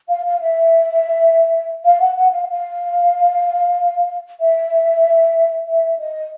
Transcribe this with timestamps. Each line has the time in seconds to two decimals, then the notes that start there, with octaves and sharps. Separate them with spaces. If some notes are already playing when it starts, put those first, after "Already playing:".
0.09 F5
0.26 F5
0.41 E5
1.85 F5
2.01 F#5
2.16 F#5
2.32 F5
2.49 F5
4.40 E5
5.66 E5
5.99 D#5